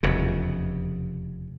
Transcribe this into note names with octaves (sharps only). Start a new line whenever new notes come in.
F1 E2 C#3